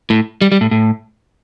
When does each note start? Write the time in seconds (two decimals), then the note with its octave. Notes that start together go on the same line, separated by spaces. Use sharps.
0.10 A2
0.41 G3
0.52 G3
0.61 A2
0.71 A2